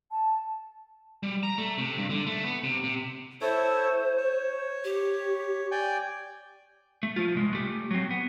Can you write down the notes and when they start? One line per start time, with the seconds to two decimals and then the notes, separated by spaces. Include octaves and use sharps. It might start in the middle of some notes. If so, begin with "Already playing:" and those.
0.11 A5
1.23 G3
1.43 A#5
1.58 A3
1.78 C3
1.98 G2
2.10 D3
2.26 A3
2.44 B3
2.64 C3
2.84 C3
3.42 E4 A4 C5 C#5
4.18 C#5
4.84 G4
5.71 D5 G5 G#5
7.03 A3
7.16 F3 F4
7.35 C2 G#3
7.53 A3 G4
7.91 F#3 C4
8.11 B3